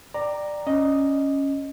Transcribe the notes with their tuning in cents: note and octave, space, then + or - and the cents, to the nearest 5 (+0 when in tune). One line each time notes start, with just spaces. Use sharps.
D5 +10 G5 +0 A#5 +0
C#4 +0 D#5 +0